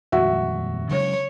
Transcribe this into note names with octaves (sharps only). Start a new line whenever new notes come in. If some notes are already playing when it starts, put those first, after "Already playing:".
D#1 F2 G#3 F#4 E5
C#3 F#3 G#3 C#5